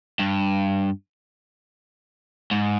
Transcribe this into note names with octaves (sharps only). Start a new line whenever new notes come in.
G2
G#2